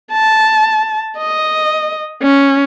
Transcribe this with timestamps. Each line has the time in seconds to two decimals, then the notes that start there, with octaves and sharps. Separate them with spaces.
0.12 A5
1.18 D#5
2.22 C#4